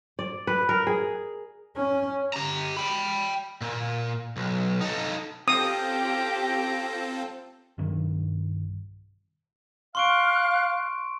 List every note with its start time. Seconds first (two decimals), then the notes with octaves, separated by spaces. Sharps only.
0.19 D5
0.47 B4
0.69 A#4
0.87 G#4
1.77 C#4
2.33 G4 A#5
2.77 G5 B5
3.61 A#2
4.37 B1
4.81 D#4 A4
5.48 C4 C#4 F4 G4 A4 G5 A#5 D#6
7.78 B1 G2 D#3
9.95 F5 C6 C#6 F6 F#6 D7